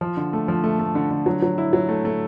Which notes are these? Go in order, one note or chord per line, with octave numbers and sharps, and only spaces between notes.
F3
D3
A3
F3
A3
A3
D3
D3
F#3
F#3
E4
F#3
A3
A3